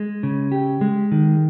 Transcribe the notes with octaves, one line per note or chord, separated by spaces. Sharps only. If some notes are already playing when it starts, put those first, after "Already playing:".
Already playing: G#3
C#3
G4
G#3
D#3